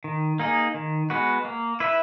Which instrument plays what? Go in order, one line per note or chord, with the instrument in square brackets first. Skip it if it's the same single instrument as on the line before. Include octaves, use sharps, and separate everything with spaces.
[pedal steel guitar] D#3
A#3 D#4 G#4
D#3
G#3 B3 F#4
A#3
E4 B4 E5